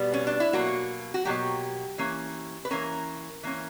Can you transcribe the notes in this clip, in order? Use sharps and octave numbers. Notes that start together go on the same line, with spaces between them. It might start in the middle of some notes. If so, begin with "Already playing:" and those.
Already playing: B2 G3 B3
C#4
D4
E4
B2 F#3 A#3 F#4
F#4
B2 F#3 A#3 G4
E3 A#3 C#4
B4
E3 A#3 C#4 A#4
E3 A#3 C#4